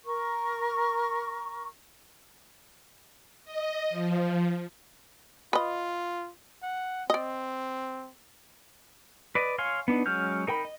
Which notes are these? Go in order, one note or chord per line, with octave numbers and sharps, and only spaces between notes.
A#4 C#6
D#5
F3
F4 B4 D#5
F#5
C4 D5 D#5
B4 D5 D#5
C#5 F5 G#5 C6
B3 D4 D#4
F#3 G#3 C#4 F6 G6
D#4 A#4 G5 B5
D#5